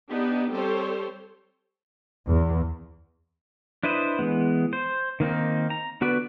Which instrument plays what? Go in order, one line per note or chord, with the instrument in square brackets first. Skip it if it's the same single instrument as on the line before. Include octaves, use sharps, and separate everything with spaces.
[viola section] B3 D4 D#4 G4
G3 C4 G4 A4 C5 C#5
[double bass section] E2
[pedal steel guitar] D4 E4 B4 C5 D#5
E3 G#3 B3
C5
D#3 A#3 C4 D#4
A#5
D3 B3 F#4 B4 D5